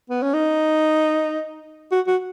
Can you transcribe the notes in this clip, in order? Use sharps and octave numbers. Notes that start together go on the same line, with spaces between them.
B3
C#4
D#4
F#4
F#4